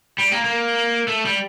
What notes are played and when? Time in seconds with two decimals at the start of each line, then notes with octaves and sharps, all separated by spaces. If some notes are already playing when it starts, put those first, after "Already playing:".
0.18 G3
0.32 A#3
0.44 A#3
1.08 A3
1.25 G3